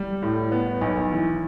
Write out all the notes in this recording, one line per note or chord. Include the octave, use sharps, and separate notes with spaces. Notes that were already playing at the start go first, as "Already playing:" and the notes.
Already playing: G3
A2
B3
B1
E3